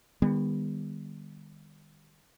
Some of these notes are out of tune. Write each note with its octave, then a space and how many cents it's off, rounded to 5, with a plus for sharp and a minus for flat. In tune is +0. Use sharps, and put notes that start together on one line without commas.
D#3 -20 G3 +40 B3 +0